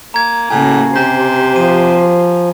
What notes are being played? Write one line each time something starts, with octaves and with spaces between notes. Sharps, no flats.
A#3 A#5 G#6
A2 C#3 A#3 F#4 G#5
C3 G4 C5
F3 D#7